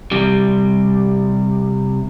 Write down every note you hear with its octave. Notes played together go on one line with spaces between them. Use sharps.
C3 G3